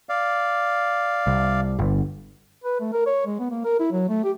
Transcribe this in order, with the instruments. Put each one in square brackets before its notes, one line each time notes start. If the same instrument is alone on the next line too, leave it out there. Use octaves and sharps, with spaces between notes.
[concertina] D5 F5
[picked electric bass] C2
G1
[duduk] B4
A3
A#4
C#5
G#3
B3
A#3
A#4
E4
F#3
A3
G4